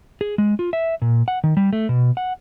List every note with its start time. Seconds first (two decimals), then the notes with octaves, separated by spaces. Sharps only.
0.21 G#4
0.38 G#3
0.59 F4
0.73 E5
1.02 A#2
1.28 F#5
1.44 D#3
1.57 G3
1.73 A3
1.89 B2
2.17 F#5